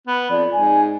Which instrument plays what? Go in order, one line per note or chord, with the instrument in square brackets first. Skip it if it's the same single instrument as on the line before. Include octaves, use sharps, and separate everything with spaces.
[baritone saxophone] B3
[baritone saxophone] F2 [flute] D5
[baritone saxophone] G#2 [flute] G#5